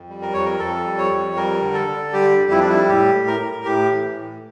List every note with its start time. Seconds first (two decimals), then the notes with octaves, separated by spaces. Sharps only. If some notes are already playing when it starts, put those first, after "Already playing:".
Already playing: F2
0.09 G3
0.22 A#4
0.34 F2 C#5
0.45 A#4
0.59 F2 A4
0.85 G3
0.98 C#5
1.11 F2
1.36 G3 A#4
1.62 D3
1.74 A4
1.87 D3
2.13 G3 G4
2.38 F2
2.51 E4
2.60 G3 D4
2.69 E4
2.89 A2 G4
3.14 A2
3.27 A#4
3.39 A2
3.65 A2 G4
3.91 E3
4.17 A2